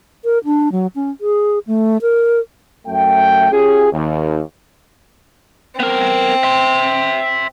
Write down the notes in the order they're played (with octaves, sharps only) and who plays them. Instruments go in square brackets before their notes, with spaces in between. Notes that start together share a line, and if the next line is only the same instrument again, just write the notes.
[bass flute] A#4
D4
F#3
C#4
G#4
A3
A#4
[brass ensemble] F#2 A3 E5 G5
C#4 F4 G4 G#4
D#2
[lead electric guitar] B3 A#4 [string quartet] C4
[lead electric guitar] E5 C6